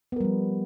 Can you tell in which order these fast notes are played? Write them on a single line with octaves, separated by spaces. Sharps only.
B3 A#4 G3 F3